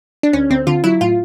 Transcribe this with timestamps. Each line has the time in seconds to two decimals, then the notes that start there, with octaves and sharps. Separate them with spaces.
0.23 D4
0.33 D2 C#4
0.50 D2 C4
0.67 D3 F4
0.84 F#3 E4
1.01 A2 F4